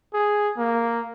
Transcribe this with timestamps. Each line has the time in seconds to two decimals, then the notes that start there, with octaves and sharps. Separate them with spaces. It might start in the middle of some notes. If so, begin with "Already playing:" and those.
0.14 G#4
0.58 A#3